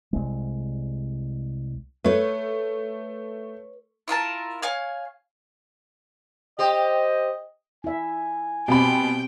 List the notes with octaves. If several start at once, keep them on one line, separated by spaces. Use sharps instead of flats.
C2 G#3
A3 B4 C#5
E4 F4 A#4 A5
C#5 F5 G#5
G4 C5 D#5
E4 E5 G#5
B2 C4 G4 G5 B5